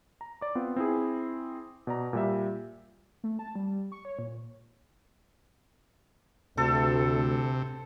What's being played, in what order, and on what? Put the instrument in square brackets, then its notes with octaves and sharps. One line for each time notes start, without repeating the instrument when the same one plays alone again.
[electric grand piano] A#5
D5 D6
B3 C4 F4
C4 E4 G#4
B2 D5 A#5
A#2 G3 E5
[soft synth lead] A3
A5
G3
C#6
C#5
A#2
[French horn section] D2 [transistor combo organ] C3 [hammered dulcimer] A4